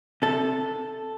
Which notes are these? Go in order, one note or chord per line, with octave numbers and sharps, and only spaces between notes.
C3 A4